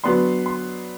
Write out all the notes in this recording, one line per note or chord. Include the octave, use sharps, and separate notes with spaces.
F#3 B3 D4 C6
C6